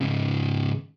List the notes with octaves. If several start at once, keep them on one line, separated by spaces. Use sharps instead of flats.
G#2 C#3